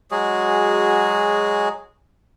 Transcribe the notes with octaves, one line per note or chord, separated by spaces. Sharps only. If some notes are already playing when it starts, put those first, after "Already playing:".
F#3 G#3 F#4 G#4